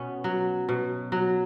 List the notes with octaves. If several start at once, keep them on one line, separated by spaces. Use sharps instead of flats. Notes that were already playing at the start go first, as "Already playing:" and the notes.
Already playing: B2 B3 C#4
F#3
B2
F#3